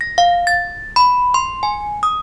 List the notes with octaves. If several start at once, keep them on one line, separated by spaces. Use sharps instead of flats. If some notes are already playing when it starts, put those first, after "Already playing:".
A#6
F5
A6
B5
C6
G#5
D#6